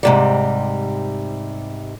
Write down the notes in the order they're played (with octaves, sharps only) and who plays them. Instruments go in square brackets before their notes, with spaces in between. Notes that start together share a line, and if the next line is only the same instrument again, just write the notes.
[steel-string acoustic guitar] G#2 C3 G3